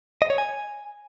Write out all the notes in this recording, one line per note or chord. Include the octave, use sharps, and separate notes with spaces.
D#5
C#5
G#5